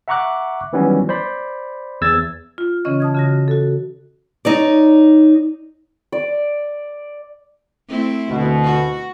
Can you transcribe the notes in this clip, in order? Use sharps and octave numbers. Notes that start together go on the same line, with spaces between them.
E5 F#5 A#5 C#6 D6 F#6
D#3 E3 F#3 G3 B3 C#4
C5 D5 B5
E2 E6 G#6 A6
F4
C#3 E3 C#4 D#5 C#6
A5 D#6 G#6
C#3 F#4 A#6
F#4 A4
D#4 C#5 D5
D5
A3 C4 E4
D2 B2
F#4